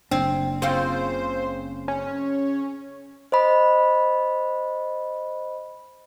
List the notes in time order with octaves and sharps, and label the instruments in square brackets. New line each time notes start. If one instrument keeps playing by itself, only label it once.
[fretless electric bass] F#1 D4 [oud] C4
[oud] C#3 C4 F4 [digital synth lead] C5
[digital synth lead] C#4
[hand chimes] C5 D#5 B5